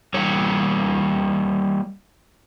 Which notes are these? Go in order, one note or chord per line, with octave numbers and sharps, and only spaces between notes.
G3 A#3 C#5